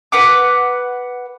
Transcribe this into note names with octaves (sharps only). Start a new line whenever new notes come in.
B4 F#5 D6